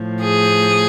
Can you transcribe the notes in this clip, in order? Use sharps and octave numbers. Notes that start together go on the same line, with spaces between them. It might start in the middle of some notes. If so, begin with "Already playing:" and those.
Already playing: A2 F3
G#4